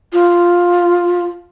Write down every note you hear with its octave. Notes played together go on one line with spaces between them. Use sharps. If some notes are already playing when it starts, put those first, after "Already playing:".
F4